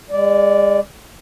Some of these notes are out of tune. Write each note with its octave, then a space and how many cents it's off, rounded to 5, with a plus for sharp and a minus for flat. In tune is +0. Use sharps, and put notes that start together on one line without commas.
G#3 -40 D5 -10